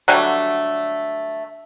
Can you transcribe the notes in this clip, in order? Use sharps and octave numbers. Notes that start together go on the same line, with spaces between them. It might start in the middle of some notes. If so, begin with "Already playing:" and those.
D3 F#3 G3 A3